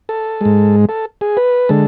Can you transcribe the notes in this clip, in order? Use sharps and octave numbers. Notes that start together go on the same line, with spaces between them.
A4
G#2 G#3
A4
G#4
B4
D3 G#3 A4